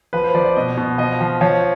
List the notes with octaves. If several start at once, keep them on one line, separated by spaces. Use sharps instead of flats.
F3 B4
C5
F3 D5
D5
B2 D#5
B2
F3 D#5
F3
F3 C#5